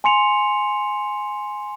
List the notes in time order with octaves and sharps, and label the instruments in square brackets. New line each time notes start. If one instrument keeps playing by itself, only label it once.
[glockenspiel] G#5 C6 C#7 F7